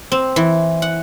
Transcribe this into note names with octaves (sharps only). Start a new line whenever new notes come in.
C4
E3
F#5